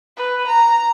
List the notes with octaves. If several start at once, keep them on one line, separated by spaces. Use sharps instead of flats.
B4
A#5